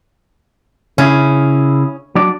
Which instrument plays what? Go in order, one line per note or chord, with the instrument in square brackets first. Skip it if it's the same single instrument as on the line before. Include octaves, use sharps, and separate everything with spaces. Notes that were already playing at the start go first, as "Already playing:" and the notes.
[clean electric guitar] C#3 E4 G#4 [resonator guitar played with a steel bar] C#4
[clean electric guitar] F#3 D4 D5